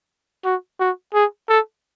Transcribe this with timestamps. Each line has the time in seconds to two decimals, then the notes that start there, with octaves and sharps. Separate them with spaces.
0.45 F#4
0.80 F#4
1.14 G#4
1.49 A4